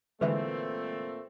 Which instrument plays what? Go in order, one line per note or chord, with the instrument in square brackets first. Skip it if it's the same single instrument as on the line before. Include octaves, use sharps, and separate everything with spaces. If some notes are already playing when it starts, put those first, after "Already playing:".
[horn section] A#2 A3 C4 [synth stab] D3 E3 G#3 [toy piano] B4 E5